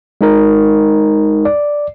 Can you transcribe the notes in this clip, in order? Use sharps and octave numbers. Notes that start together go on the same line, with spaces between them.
G#3 D#4 A#4
D5